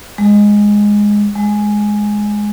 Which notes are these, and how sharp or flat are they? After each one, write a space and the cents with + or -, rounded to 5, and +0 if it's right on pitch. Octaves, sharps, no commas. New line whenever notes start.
G#3 -5
G#3 +5